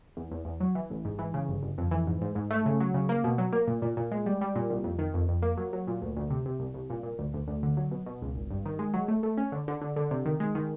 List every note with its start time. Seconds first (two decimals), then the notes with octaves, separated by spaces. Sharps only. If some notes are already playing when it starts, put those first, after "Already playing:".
0.17 E2
0.31 E2
0.45 E2
0.60 F#3
0.75 E3
0.90 A1
1.05 G#2
1.19 E3
1.34 C#3
1.48 G1
1.62 G1
1.78 F2
1.91 E3
2.07 G#2
2.21 G#2
2.35 G#2
2.51 A3
2.66 C#3
2.80 F#3
2.94 C#3
3.09 A#3
3.24 B2
3.38 F#3
3.53 A#3
3.67 A#2
3.82 A#2
3.97 A#2
4.11 G#3
4.26 G3
4.41 G3
4.56 A#2
4.70 C2
4.84 F2
4.99 D#3
5.14 F2
5.29 F2
5.42 A#3
5.57 F#3
5.73 F#3
5.87 A#2
6.02 D2
6.16 D2
6.30 C3
6.46 C3
6.60 C2
6.74 C2
6.90 A#2
7.03 A#2
7.18 D2
7.34 D2
7.48 D2
7.63 D3
7.77 F#3
7.91 B2
8.06 B2
8.22 C#2
8.35 G#1
8.50 G2
8.66 D#3
8.79 G#3
8.94 F#3
9.08 A3
9.23 A3
9.37 C#4
9.52 D3
9.68 D3
9.81 D3
9.96 D3
10.11 C3
10.25 D#3
10.40 G#3
10.55 D#3